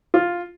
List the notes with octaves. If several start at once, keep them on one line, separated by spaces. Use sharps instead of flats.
F4